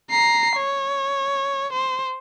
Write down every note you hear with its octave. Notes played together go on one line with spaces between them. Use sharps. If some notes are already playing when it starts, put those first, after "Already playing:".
A#5 C7
C#5
C5